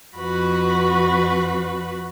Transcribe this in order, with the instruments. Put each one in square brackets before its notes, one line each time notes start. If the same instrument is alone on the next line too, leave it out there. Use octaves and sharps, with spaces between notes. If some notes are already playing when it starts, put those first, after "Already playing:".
[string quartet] F2 F#4 B4 B5